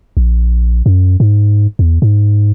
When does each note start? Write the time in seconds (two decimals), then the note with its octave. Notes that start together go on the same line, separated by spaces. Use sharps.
0.17 A#1
0.86 F#2
1.20 G#2
1.79 E2
2.02 G#2